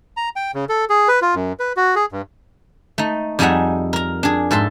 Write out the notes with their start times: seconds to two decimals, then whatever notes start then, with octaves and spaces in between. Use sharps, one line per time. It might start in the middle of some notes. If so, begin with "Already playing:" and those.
0.17 A#5
0.36 G5
0.54 C#3
0.69 A4
0.90 G#4
1.08 B4
1.22 F4
1.35 F#2
1.59 B4
1.77 F#4
1.96 G#4
2.12 G2
2.98 A3 D#4
3.39 F2 G3 D#4 G#4 E5 F#5
3.93 A#4 A#5
4.23 D4 G#4
4.51 G#2 A4 E5 C6